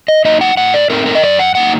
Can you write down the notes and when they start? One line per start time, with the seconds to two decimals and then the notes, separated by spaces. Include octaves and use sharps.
0.08 D#5
0.25 F#3 A#3 D#4 D#5
0.41 F#5
0.57 A2 F#5
0.74 D5
0.90 A3 C4 D#4 A#4
1.06 A#4
1.15 D#5
1.22 F#2 D5
1.39 F#5
1.55 F#3 A#3 D#4 F#5